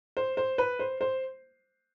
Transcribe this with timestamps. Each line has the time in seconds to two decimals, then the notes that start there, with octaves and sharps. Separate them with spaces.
0.17 C5
0.37 C5
0.58 B4
0.79 C5
1.01 C5